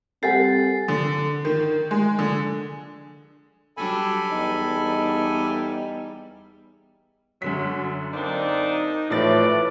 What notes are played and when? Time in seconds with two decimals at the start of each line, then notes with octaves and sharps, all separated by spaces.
0.23 G3 C4 G4 A4 F#5 G#5 A6 C7
0.88 D3
1.45 D#3
1.91 G#3
2.19 D3
3.77 F#3 G3 D4 A4 G#5 B5
4.32 E2 G3 D#4
7.42 F#2 D3 F#3 B6
8.13 A#3 C4 D4 D#4
9.10 A2 E3 F3 A4 B4 D5 A6